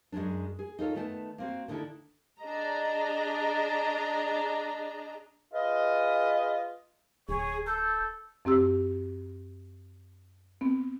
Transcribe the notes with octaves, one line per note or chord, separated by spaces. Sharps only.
F#2 G#3 A3 C#4 D4
G#4
D#4 F4 A4 C#5
D#3 A3 B3 F#5 A5
A#3 C4 F#4
D3 D#3 D4 E4 A4
D4 G#4 D#5 A#5
F4 G#4 B4 D#5
D1 G#4 C#5
A4 G6
F#2 C4 G4 E6
B3 C4